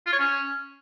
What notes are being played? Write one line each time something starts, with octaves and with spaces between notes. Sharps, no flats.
F4
C#5
C#4